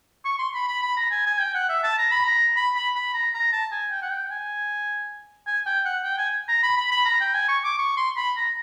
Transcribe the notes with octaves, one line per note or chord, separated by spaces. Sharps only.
C#6
C6
B5
B5
B5
A#5
G#5
G#5
G5
F#5
E5
A5
A#5
B5
A#5
B5
B5
B5
A#5
A#5
A5
G#5
G5
F#5
G5
G#5
G#5
G5
F#5
G5
G#5
A#5
B5
B5
B5
A#5
G5
G#5
C#6
D6
C#6
C6
B5
A#5